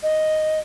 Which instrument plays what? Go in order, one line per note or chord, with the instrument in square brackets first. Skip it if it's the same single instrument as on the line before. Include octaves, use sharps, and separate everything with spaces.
[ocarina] D#5